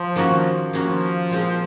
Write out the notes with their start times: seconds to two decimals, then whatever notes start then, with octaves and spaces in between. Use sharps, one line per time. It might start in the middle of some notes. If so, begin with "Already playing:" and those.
Already playing: F3
0.16 D#3 A#3 C#4 F#4
0.73 D#3 F3 A#3 C#4 F#4
1.31 A#2 G#3 C4